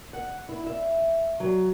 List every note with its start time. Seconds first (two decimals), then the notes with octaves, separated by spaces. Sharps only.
0.13 F#5
0.49 E4
0.67 E5
1.40 F#3